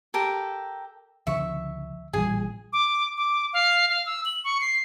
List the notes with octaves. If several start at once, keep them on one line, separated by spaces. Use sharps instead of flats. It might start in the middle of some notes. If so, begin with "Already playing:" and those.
G4 A4 A#4
C#2 D3 F3 E5 C#6
A1 A#2 G3 G#4 G#5
D6
D6
F5
F5
E6
F#7
C#6
C7